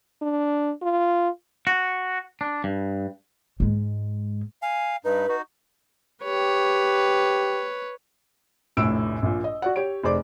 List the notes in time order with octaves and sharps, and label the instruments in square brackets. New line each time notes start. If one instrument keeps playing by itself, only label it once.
[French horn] D4
F4
[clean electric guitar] F#4
D4
G2
[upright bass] G#2 G#3
[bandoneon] F5 [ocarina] G#5
[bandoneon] G2 D#4 [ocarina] B4
[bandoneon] D#4 F#4
[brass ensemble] G4 [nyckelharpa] B4 C#5
[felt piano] F1 A#1 A2 E6 D7
A#1 A#2
D#5
F#4 D5 F#5
G4 C#5 D7
F1 G#4 C5 D5 D6